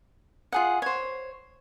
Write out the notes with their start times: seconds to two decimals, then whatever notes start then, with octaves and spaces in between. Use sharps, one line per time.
0.52 F4 G#4 F#5
0.82 C5 C#5